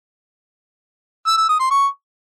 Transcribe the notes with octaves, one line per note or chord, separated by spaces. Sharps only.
E6
E6
D#6
C6
C#6